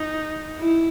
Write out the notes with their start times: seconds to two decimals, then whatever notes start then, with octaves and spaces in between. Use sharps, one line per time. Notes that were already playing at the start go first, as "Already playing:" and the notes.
Already playing: D#4
0.59 E4